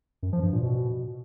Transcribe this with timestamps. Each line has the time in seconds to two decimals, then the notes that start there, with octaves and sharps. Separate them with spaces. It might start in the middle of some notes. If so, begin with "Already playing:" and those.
0.23 F#2
0.33 F3
0.43 G2
0.53 A#2
0.63 B2